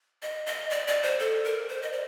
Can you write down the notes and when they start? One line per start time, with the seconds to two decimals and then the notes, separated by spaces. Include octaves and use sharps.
0.22 D#5
0.46 D#5
0.70 D5
0.87 D5
1.03 C5
1.19 A4
1.44 A#4
1.69 C5
1.82 D#5
1.92 D5